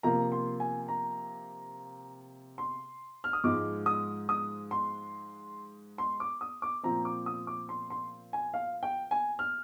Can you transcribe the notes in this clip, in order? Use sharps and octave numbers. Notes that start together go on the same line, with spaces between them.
C3 F3 A#3 A#5
C6
G#5
A#5
C6
F6
D#6
G#2 F3 G#3 D6
D#6
D#6
C6
C6
D6
D#6
D6
A#2 F3 C4 A#5
D6
D#6
D6
C6
C6
G#5
F5
G5
G#5
F6